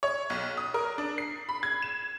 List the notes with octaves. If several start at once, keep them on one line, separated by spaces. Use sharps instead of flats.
C#5
B1
D#6
A#4
D4
C7
B5
G#6
E7